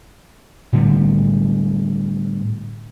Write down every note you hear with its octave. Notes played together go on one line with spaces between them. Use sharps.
A2 D3 G3 B3